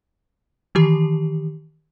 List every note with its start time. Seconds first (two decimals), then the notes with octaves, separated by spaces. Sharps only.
0.75 D#3 E3 G4